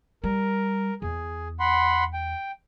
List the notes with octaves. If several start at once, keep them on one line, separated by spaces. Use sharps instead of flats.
G3 A#4
E2 G#4
F#5 B5 C6
G5